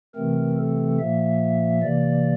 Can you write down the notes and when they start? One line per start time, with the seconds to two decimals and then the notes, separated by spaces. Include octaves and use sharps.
0.15 C3 E3 A3 C4 A#4
0.57 A4
0.99 A#2 F3 A#3 E5
1.82 C3 E3 A#3 D5